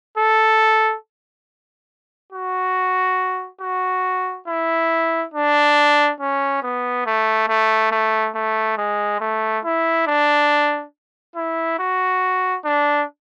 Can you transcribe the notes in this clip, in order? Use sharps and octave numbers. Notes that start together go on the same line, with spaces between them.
A4
F#4
F#4
E4
D4
C#4
B3
A3
A3
A3
A3
G#3
A3
E4
D4
E4
F#4
D4